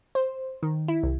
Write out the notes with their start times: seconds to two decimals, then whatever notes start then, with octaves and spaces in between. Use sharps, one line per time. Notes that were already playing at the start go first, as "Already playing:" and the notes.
0.15 C5
0.63 D#3
0.88 E4
1.03 C2